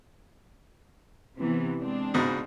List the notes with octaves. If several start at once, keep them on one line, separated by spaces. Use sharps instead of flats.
C3 E3 B3
G#3 C4 D4
C#2 G#2 B2